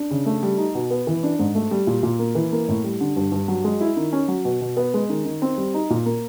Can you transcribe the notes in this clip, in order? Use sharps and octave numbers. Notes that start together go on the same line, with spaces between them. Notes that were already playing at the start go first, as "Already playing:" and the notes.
Already playing: D4
C#3
A3
G3
D#4
B2
B3
E3
D4
G#2
A3
G3
A#2
A#2
A#3
E3
A#3
A2
G3
D3
G2
G2
F#3
G#3
E4
D#3
C#4
F#3
B2
B2
B3
G#3
D#3
D#3
C4
G3
D#4
A#2
A#3